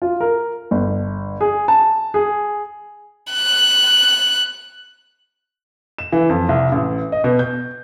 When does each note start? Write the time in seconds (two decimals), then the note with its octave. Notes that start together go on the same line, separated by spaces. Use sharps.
0.02 F4
0.20 A#4
0.71 G1
1.41 G#4
1.68 A5
2.14 G#4
3.33 F#6
5.98 E7
6.12 E3
6.30 F2
6.49 C2
6.72 A1
7.12 D#5
7.24 B2
7.39 G6